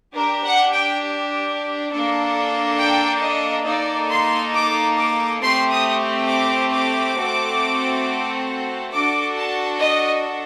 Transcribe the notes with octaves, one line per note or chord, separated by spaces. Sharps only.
D4 G4 A#4
F#5
G5
A#3 D4 A4
G5
D#5
A#3 D#4 A4 D5
C6
D6
D6
A3 C4 G4 C6
D#6
D6
D6
A3 C4 F#4 A4
D4 F#4 A4 D6
A5
D#5